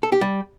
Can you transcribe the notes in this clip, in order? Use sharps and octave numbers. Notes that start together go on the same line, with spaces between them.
A4
G4
G3